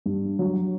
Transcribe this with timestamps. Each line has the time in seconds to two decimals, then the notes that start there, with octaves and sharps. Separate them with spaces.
0.06 G2
0.39 F#3